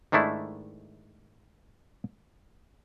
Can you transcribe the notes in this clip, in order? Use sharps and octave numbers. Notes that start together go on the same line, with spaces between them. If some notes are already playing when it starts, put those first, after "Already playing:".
G#2 D#3 A3 D4 E4